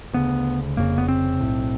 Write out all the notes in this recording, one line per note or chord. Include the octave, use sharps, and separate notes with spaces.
D2 C#3 B3
F1 F2 C#3 A#3
B3
C4
B1 A2